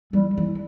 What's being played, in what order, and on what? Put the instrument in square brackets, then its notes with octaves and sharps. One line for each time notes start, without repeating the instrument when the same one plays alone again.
[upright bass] E3 [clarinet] G3
[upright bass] E3